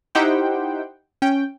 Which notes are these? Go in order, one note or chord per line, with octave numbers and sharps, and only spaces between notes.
D#4 E4 G4 C5 F#5 G5
C#4 G5